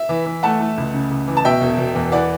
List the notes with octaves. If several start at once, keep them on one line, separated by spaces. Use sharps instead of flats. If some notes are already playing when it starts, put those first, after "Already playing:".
Already playing: E5
E3
E3
A3 F#5 A5
A3
C#2
C#3
C#2
E3
A5
B2 E5 G5
E1
E1
E2
E3 D5 F#5